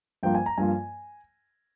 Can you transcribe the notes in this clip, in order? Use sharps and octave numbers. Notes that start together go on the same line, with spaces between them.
G2 F3 A#3 F4 G5
G#5
A#5
G2 F3 A#3 F4 G#5